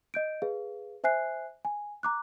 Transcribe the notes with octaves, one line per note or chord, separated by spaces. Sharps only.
D#5 G6 D7
G#4 B4 F5
C5 E5 G#5 F#6 C7
G#5
A#5 D6 F#6